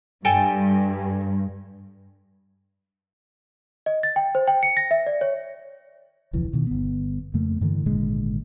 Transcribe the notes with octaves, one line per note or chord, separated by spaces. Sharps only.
G2 A4 G5 G#5
D#5
A6
G5
C5
G5
C#7
A#6
E5
D5
C#5
E1 C#2 E3 F3
B2 D#3
G1 B3
F2 C#3 A3 A#3
G2 D3 E3 A3
G#1 A#2 D3 G#3